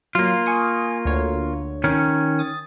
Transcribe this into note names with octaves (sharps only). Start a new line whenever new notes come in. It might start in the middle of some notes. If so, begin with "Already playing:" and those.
F#3 A#3 F4
G#5 C#6 D#6
D2 D3 C#5
D#3 C#4
D#6 A6